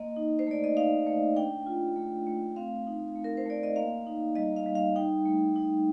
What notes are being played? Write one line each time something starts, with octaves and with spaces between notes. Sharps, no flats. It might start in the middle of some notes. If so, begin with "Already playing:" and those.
Already playing: A#3 D#5
D#4
C5
A3 D5
D#5
D#4 F5
A3
D4 G5
F4
A3
A3
C4 F5
D#4
A3
A#4
C5
A3 D5
D#5
A#3 F5
D#4
G3 D#5
F5
G3
F5
D#4 G5
A3
D#4